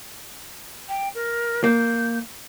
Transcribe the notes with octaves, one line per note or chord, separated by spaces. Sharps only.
G5
A#4
A#3 G6